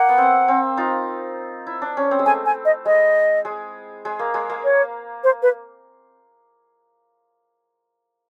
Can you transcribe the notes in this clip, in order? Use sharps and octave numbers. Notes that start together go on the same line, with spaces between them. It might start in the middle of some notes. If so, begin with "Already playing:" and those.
Already playing: A#3 F#5
B3
C4
C4
D#4 F4
E4
D4
C#4
C4
G#3
A3 G#5
G#5
D#5
G#3 D#5
G#3
G#3
A#3
G#3
A#3
C#5
C5
B4